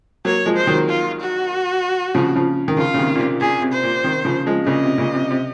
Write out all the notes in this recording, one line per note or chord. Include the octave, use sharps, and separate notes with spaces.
F#3 A#3 C#5
F3 G#3
C5
D#3 F#3
F4
F#4
C#3 F3
C#3 F3
D#3
C#3 F3 F4
C#3
C3 D#3
A#2
C3
A#2 G#4
C3
C5
A#2
C3 D#3
C#3 F3
F3 G#3
A#2 C#3 D#5
C3
A#2 C#3
C3
C3